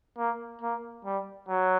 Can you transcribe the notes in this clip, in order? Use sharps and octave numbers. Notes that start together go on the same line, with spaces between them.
A#3
A#3
G3
F#3